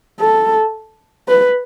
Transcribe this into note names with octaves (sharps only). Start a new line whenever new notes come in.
A4
B4